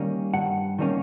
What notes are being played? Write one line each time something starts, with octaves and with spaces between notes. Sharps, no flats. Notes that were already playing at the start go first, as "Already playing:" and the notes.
Already playing: D#3 G3 A#3 C#4
G2 F#5
D#3 G3 A#3 C#4